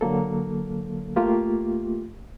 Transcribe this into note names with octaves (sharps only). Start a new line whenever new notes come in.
D3 F#3 A#3 A4
A3 A#3 F4 G4